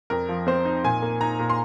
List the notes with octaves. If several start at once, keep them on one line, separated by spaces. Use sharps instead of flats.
F2 A#4
F3
C4 C5
D#4
A#2 G#5
A#3
D#4 A#5
A#2
C6